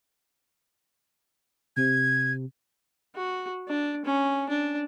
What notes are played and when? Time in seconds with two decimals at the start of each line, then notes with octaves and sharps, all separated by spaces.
1.77 C3 G#6
3.15 F#4
3.68 D4
4.05 C#4
4.49 D4